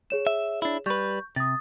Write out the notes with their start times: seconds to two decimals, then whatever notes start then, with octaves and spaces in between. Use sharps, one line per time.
0.10 G#4 C#5 E7
0.27 E5
0.62 D4 E4
0.86 G3 B4 C#6 G6
1.36 C3 D#6 A6